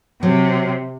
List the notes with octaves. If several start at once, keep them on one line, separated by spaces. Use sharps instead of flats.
C3 F#3